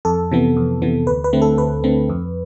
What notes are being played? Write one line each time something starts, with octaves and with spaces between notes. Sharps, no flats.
F2 A4
C3 E3 B3
F2
C3 E3 B3
D2 B4
B4
D3 A3 C4
A4
D2 B4
D3 A3 C4
F2